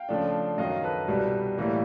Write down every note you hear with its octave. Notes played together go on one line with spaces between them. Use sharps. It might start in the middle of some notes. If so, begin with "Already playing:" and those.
Already playing: F5 G5
C#3 F3 A3 D4
F#2 D#3 F#3 D#5 F5
A4 B4
C2 B2 G3
A2 E3 G3 A#3